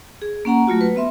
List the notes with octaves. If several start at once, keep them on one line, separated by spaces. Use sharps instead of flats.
G#4
A#3 C#4 F#5 A#5
F#3 A3 F4 F#4
B4
B3 E5 C6